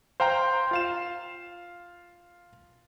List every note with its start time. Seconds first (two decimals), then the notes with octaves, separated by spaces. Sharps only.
0.20 C5 F5 G5 A#5 G6
0.71 F4 F5 E7